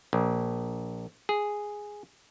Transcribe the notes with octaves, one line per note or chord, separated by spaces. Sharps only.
A#1
G#4